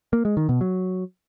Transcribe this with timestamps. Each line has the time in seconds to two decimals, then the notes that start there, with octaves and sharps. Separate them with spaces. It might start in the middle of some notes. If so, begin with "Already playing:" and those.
0.13 A#3
0.25 G#3
0.37 D#3
0.49 B2
0.61 F#3